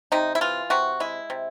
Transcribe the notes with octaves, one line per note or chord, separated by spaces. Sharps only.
C3 D#4
E4
E3 F4
C3 F#4
G#3 E4
C3